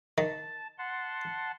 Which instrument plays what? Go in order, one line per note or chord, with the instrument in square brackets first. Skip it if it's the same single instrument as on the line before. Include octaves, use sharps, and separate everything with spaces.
[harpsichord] D#3 [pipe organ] A5
[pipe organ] F#5 A5 C6